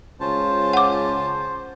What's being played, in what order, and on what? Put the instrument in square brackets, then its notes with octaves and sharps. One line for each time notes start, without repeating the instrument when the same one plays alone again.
[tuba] C#2 [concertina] C#4 F4 A5 [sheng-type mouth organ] C5
[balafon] F#5 D6